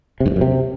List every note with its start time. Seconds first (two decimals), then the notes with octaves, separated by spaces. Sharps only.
0.20 C3
0.26 G2
0.31 E2
0.36 F#2
0.41 C3